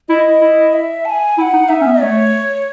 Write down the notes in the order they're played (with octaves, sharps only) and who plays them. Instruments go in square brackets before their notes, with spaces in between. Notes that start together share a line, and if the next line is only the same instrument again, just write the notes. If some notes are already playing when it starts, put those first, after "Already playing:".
[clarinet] E4 [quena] D#5
[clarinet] E4
[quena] E5
A5
G#5
[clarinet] E4 [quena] G#5
[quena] F#5
[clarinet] D#4
[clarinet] D#4 [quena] E5
[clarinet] C#4
B3
[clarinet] A3 [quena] C#5